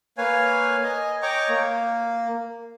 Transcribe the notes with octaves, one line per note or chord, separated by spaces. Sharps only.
A#3 B4 C#5 F5 G#5
D#5 G#5
C#5 D#5 G5 A#5 C#6 D6
A#3